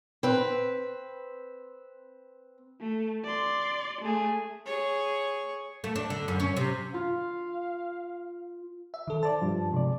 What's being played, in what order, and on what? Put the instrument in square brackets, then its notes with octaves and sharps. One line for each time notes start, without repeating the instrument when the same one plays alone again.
[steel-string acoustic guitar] C4 B4
[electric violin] A3
D5 C6
A3 G#4
[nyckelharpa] G#4 C#5
[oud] A3
D4
D3
F#2
C#4
C3
[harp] F4 [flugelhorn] F5
[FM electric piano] E5
D#3 A4
[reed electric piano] C5 D5 [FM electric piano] A5
[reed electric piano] G2 F3
[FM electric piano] C3 [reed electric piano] G#3 D5